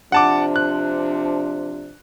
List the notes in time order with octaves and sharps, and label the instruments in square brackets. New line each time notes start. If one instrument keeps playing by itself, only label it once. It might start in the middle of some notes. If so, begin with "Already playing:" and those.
[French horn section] C3 F3 D4 [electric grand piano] F#5 A5 D6
[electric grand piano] F#6